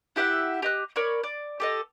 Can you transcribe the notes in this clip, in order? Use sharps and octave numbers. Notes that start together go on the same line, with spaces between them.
E4 G4 E5 F#5
G4 D#5 F#6
A#4 C#5 D5 B5
D5
G4 A4 D#5